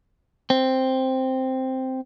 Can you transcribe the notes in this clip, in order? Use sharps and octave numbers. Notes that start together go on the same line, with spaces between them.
C4